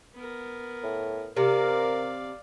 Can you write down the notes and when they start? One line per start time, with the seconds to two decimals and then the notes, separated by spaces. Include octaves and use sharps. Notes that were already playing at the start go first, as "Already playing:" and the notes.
0.15 B3 A#4
0.83 A2
1.37 C3 A#4 D5 F5